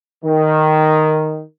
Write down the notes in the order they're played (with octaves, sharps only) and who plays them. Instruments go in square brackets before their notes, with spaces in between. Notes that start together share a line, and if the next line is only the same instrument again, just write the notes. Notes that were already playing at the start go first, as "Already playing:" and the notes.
[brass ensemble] D#3